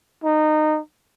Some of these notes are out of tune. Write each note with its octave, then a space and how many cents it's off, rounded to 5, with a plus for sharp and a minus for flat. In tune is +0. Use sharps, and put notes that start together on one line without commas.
D#4 -20